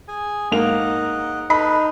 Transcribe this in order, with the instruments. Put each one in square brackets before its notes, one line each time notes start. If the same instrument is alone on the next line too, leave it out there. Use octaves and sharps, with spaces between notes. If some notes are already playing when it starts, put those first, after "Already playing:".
[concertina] G#4 G#5
[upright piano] G#2 A#3 F7 [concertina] D#5 F#5
[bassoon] D#4 [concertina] A4 B4 [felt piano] B5